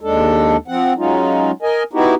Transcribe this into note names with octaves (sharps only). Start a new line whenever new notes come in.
D#2 G#3 D4 A4
F3 C4 F#5
F#3 G#3 C#4 D#4 F4
A#4 D#5 G#5
B3 D#4 E4 F#4 G4